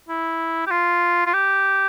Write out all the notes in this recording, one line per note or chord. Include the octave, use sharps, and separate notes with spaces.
E4
G4
F4
F4
G4